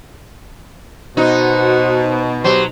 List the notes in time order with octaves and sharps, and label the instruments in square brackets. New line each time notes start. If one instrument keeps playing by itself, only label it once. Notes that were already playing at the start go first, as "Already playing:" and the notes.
[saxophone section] B2 [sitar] D#4 [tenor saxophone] F#4 [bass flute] C5
[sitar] F#3 [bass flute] G4 [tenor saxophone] C5